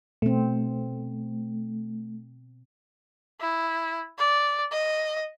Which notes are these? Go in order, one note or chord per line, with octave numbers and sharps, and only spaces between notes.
B2 A3 C4
E4
D5
D#5